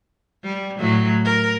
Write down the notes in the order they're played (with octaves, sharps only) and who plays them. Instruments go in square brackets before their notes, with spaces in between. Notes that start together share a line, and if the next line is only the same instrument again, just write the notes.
[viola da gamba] G3
A2 F#3
A#4